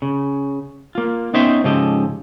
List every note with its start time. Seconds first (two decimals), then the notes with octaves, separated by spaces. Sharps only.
0.02 C#3
0.95 A#3 F4
1.34 B3 C#4 D#4 C5 E5 G5
1.64 G#2 C#3 F3 G4 A4 D#5